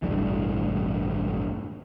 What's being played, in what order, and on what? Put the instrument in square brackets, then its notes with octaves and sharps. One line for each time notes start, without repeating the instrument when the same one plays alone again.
[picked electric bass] E1 A1 G2 E3